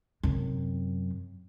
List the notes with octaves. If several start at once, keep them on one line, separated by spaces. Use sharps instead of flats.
F#2 C3